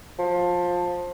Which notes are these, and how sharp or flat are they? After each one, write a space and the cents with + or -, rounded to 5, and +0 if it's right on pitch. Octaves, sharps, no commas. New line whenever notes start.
F3 +20